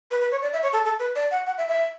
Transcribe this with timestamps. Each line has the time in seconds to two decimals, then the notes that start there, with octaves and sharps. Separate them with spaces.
0.11 B4
0.21 B4
0.31 C#5
0.42 D5
0.53 E5
0.63 C#5
0.73 A4
0.85 A4
0.99 B4
1.16 D5
1.31 F#5
1.47 F#5
1.58 E5
1.68 E5